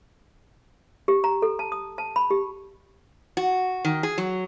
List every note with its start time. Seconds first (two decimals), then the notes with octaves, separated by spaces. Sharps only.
1.08 G4
1.24 A#5
1.42 A4
1.59 A5
1.72 D#6
1.98 A5
2.16 B5
2.31 G4
3.37 F#4
3.85 D#3
4.03 G#4
4.18 F#3